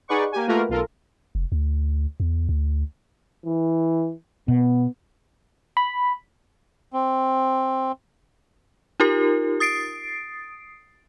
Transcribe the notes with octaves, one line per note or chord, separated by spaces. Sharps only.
D#4 G#4 B4 D5 F#5 C#6
A#3 G4 G#5
A3 A#3 F4 F#4 A#4 B4
B1 F4 A4 A#4
F1
D2
E2
D2
E3
B2 B3
B5
C4
D#4 F4 G4 A#4
D#6 A6 C7 D7